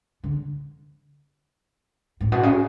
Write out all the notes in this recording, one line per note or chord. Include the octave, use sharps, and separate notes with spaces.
D3
A2
B2
C#3